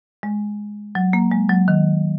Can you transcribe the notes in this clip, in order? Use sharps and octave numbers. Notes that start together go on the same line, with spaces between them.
G#3
F#3
A#3
G#3
F#3
D#3